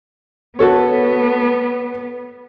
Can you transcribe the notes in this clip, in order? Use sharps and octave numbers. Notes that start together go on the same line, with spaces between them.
B3 F#4 A4 C#5